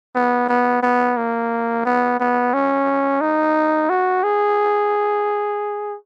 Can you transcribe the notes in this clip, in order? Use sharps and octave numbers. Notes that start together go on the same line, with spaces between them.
B3
B3
B3
A#3
B3
B3
C#4
D#4
F#4
G#4